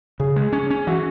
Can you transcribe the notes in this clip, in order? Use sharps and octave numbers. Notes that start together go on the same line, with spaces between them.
C#3 G#4
G#3
C#4
C#4
E3 F#4